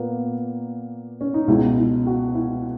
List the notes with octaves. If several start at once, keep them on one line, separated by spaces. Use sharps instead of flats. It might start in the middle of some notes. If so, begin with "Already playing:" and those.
Already playing: A#2 A#3 B3
C#4
D#4
C#2 B2 G#3 E4
E4
F#4
E4